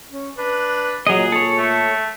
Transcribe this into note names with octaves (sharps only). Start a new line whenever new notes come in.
C#4
D4 B4
A#2 F#3 G#4 D#5
A4 C#5
A3